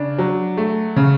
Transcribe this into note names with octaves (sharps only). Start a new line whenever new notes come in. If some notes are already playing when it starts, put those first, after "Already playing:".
Already playing: C#3 D4
F#3
A3
C#3